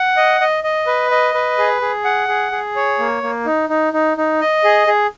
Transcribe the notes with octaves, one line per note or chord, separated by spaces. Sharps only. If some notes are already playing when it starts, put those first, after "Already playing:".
Already playing: F#5
D#5
D#5
D#5
B4
D#5
B4
G#4
G#4
F#5
G#4
G#4
C#5
A#3
A#3
D#4
D#4
D#4
D#4
D#5
G#4
G#4